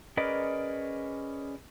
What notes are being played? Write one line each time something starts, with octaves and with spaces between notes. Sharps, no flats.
C#4 G#4 A#4 B4 D5 D#5